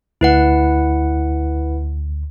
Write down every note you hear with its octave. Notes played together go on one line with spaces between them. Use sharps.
D2 E4 B4 F#5